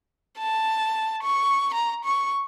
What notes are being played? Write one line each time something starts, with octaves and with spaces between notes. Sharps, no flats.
A5
C#6
A#5
C#6